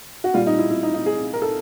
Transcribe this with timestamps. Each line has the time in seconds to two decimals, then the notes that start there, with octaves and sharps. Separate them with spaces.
0.24 F#4
0.34 A#2 G3 F4
0.47 D#4
0.59 E4
0.70 E4
0.83 D#4
0.94 D#4
1.06 G#4
1.34 A#4
1.42 A4